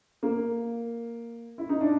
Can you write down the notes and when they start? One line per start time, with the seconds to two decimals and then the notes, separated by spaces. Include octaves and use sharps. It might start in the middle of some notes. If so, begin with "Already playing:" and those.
0.23 A#3
1.58 E4
1.69 D#4
1.81 D4